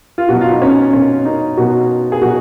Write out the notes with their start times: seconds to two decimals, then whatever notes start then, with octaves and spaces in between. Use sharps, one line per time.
0.18 F4
0.29 B2 F#3 F#4
0.41 F4
0.51 D#4
0.62 C#4
0.93 B2 F#3 C#4
1.25 D#4
1.57 B2 F#3 F#4
2.12 G#4
2.22 B2 F#3 F#4